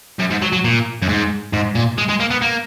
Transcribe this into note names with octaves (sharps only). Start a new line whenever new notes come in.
F#2
G#2
F#3
F#3
A#2
F#2
G#2
G#2
A#2
G#3
G#3
A#3
B3
A#3